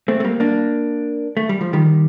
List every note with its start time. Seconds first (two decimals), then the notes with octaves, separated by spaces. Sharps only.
0.08 A3 C4
0.20 A3
0.24 G3 A#3
0.40 A#3 D4
1.37 A3
1.49 G3
1.61 F3
1.73 D#3 G3